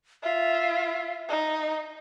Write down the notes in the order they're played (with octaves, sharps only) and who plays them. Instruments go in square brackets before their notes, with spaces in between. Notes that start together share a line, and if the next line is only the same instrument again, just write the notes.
[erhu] F4 [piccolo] E5
[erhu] D#4